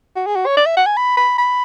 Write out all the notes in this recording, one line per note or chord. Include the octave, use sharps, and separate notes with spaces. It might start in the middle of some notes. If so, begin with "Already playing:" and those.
F#4
G#4
F#4
C#5
D5
E5
F#5
G#5
B5
B5
B5